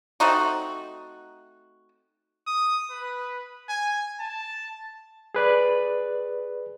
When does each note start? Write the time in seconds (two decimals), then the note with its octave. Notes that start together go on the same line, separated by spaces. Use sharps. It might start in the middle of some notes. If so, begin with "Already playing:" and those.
0.20 A3 C4 D#4 F#4
2.47 D#6
2.90 B4
3.69 G#5
4.19 A5
5.35 G#4 B4 D5